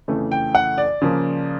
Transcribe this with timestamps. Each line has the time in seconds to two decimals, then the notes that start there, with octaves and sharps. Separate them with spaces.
0.08 F2 C#3 E3 A3
0.32 G5
0.55 F#5
0.78 D5
1.02 C#3 F3 A#3